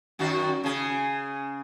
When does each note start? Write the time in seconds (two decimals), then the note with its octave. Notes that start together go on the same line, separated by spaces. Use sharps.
0.19 F#2 D#3 F#4
0.64 C#3 G#4